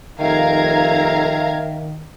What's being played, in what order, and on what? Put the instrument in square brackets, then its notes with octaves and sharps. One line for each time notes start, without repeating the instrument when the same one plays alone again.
[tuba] F1 [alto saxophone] D#3 [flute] E5 [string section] F5 A#5 G#6